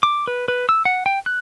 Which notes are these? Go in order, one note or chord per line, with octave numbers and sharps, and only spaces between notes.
D6
B4
B4
E6
F#5
G5
F#6